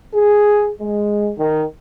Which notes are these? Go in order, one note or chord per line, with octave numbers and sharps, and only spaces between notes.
G#4
G#3
D#3